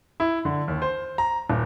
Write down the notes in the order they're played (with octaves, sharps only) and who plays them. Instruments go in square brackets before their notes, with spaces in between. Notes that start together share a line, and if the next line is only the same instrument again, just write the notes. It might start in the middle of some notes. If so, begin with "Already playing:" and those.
[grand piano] E4
D3
D#2
C5
A#5
D#1